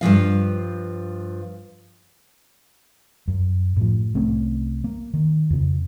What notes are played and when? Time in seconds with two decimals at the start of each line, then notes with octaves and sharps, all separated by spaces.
0.01 G2 C#3 F3 F5
3.28 F#2
3.77 A2 F3
4.14 C2 A3 C4 C#4
4.84 A#3
5.13 D#3
5.50 F2 C#3